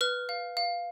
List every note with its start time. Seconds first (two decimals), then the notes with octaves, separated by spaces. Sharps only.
0.01 B4 F6
0.29 F5
0.57 F5